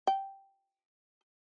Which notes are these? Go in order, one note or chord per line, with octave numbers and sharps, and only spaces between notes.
G5